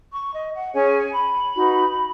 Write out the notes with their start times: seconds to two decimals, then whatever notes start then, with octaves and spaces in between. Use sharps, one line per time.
0.13 C#6
0.34 D#5
0.54 F#5
0.74 C#4 G#4 C#5 G#5
1.14 B5
1.55 D#4 F#4 B4